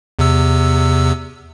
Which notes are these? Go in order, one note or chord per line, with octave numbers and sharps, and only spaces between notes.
E2 C3 E6